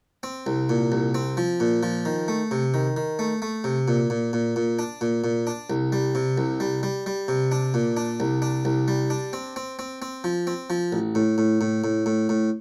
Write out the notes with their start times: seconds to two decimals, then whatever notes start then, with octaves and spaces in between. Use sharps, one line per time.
0.23 C4
0.47 C2
0.69 A#2
0.92 C2
1.15 C4
1.37 F3
1.60 A#2
1.83 F3
2.05 D#3
2.28 A3
2.51 C3
2.74 D#3
2.97 D#3
3.19 A3
3.42 A3
3.64 C3
3.88 A#2
4.10 A#2
4.33 A#2
4.56 A#2
4.79 D4
5.01 A#2
5.24 A#2
5.47 D4
5.70 C2
5.92 G3
6.15 C3
6.38 C2
6.60 G3
6.83 G3
7.06 G3
7.28 C3
7.52 D4
7.74 A#2
7.97 D4
8.20 C2
8.42 D4
8.65 C2
8.88 G3
9.10 D4
9.33 C4
9.56 C4
9.79 C4
10.02 C4
10.24 F3
10.47 C4
10.70 F3
10.92 A1
11.15 A2
11.38 A2
11.61 A2
11.84 A2
12.06 A2
12.29 A2